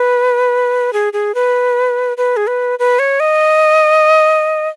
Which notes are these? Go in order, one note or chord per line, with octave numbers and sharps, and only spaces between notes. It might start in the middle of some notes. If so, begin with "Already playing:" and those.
Already playing: B4
G#4
G#4
B4
B4
G#4
B4
B4
C#5
D#5